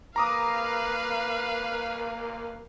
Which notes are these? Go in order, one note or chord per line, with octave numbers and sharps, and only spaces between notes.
A#3 B4 F5 A#5 D6 D#6